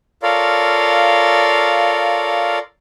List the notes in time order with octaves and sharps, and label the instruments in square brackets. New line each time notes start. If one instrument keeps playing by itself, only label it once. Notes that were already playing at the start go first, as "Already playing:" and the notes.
[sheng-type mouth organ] F4 A4 A#4 C#5 D5 F5